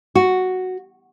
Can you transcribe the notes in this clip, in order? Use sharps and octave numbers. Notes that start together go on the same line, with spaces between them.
F#4